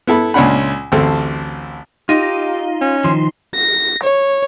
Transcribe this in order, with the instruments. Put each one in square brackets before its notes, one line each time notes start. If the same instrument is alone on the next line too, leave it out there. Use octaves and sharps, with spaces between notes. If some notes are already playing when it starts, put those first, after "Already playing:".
[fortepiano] B3 E4 A4 B5
C#2 A#2 C#4 D4 F#5 B5
A1 D2 C4 A4
[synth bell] D#4 [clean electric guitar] F4 [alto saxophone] G4
[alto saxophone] C#4
[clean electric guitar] D#3 F3 [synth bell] C6
[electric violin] A#6
C#5